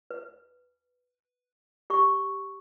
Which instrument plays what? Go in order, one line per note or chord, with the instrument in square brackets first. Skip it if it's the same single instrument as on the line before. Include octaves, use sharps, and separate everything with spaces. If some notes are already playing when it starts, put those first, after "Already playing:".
[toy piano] B4
G4 C#6